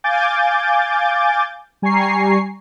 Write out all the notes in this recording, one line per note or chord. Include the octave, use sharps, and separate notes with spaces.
F5 G#5 D6 G6 A6
G3 G#5 A#5 C#6 C7